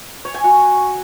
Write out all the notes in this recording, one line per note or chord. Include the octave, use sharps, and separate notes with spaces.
C#5
G#5
F#4